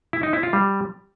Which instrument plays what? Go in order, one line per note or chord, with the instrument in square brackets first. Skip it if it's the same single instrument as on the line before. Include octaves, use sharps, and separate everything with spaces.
[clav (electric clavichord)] E4
D#4
E4
F4
G3